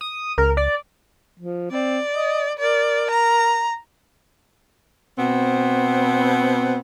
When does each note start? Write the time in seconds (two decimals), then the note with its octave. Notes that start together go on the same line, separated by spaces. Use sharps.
0.01 D#6
0.38 C#2 A#4
0.57 D5
1.40 F3
1.71 C4 D5
2.15 D#5
2.59 A#4 D5
3.11 A#5
5.18 B2 B3 C4